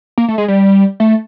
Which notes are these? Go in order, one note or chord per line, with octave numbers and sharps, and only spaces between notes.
A#3
A3
G#3
G3
A3